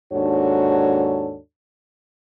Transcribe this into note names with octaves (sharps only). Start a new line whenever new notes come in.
D#2 G#2 D4 F#4 A4 C#5